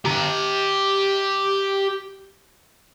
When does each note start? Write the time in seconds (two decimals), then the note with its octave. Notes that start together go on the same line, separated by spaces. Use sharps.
0.05 G4 A#5